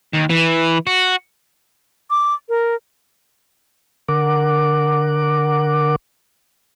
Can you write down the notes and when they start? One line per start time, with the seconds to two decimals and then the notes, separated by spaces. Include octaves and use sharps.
0.14 D#2
0.30 E3
0.87 F#4
2.10 D6
2.49 A#4
4.08 D3 A#4 F#5 D6